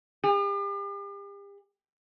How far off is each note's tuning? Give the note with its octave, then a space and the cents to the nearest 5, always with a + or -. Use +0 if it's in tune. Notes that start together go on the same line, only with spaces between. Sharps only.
G4 +40